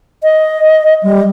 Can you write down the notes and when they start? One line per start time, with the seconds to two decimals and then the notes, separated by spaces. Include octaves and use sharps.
0.23 D#5
1.03 G3